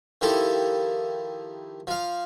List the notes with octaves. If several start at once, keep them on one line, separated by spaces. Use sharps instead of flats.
D#3 F3 E4 G4 A4
F3 F5